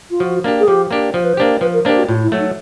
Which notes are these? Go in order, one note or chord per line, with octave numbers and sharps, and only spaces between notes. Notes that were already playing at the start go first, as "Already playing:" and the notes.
F4
F3 F#4
A#3 D4 G4
G#4
F3 G4
A#3 D4 G4
F3 C5
B4
C5
A#3 D4 G4
F3 B4
A#4
A#3 D4 G4 C5
F#4
A2 F4
E4
F#3 A3
D#4